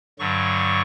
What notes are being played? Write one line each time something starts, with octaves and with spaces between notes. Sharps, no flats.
G2 D3 F#3 C#6